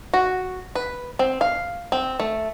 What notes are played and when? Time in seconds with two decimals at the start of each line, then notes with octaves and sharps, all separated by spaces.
0.14 F#4
0.75 B4
1.19 C4
1.41 F5
1.92 C4
2.20 A3